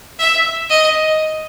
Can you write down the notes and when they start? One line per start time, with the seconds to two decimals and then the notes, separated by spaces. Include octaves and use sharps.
0.19 E5
0.70 D#5